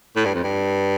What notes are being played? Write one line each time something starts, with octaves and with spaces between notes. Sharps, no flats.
A2
G2
F2
G2